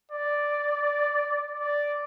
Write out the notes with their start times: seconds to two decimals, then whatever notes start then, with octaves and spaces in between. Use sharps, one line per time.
0.11 D5
1.60 D5